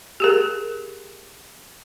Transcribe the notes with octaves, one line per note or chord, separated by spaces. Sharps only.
G4 G#4 A#4